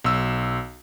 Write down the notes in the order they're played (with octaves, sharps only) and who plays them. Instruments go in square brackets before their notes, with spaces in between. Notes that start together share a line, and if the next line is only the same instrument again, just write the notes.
[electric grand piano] B1 E6